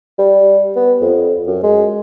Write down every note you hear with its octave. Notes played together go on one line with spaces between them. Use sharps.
G3
B3
F2
F#2
G#3